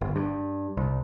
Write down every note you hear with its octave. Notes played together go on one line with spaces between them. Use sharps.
G1
G2
C2